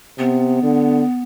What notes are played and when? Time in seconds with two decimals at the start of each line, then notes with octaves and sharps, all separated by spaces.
0.18 C3 B3
0.63 D3